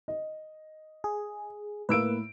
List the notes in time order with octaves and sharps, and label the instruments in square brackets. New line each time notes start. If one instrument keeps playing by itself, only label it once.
[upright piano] D#5
[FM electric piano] G#4
[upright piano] A2 E6 D7 [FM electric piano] A#3 B4